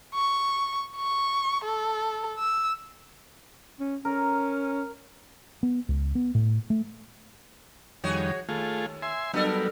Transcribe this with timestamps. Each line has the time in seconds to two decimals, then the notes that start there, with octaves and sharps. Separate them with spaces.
0.15 C#6
0.97 C#6
1.65 A4
2.39 E6
3.80 C#4
4.05 C#4 A#4
5.63 B3
5.89 C#2
6.15 B3
6.35 A2
6.70 A3
8.04 F2 D#3 G3 F#4 G#4 C#5
8.49 D#2 A3 F4 G#4
9.02 E5 G#5 C6
9.34 F#3 G3 B3 D4 A4 A#4